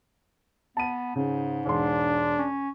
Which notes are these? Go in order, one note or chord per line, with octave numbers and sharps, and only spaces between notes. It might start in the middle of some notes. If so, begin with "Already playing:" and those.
B3 A5 D#7
G#2 C#3
E1 D4 C6
C#4